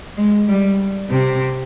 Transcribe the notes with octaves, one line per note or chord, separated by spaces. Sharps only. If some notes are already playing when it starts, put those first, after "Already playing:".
G#3
G3
C3